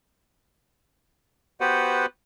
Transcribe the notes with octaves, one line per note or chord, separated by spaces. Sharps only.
B3 F#4 G4 B4 C5 F#5